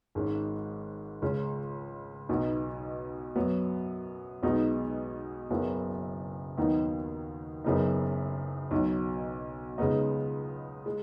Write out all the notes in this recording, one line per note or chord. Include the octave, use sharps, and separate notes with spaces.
G#1 G#2 G#3 C#4
C#2 C#3 G#3 C#4
B1 B2 B3 D#4
F#2 F#3 B3
B1 B2 G#3 B3 D#4
F#1 F#2 C#3 F#3 B3
D#2 D#3 F#3 B3 D#4
F#1 F#2 C#3 B3 D#4
B1 B2 F#3
C#2 C#3 G#3 B3 D#4
G#3